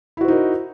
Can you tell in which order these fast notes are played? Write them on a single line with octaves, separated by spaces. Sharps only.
E4 F#4 C5 D#4 A#4